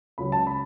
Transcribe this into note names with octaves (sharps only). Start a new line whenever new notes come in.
C#2 C#3 F#3 B5
A5
B5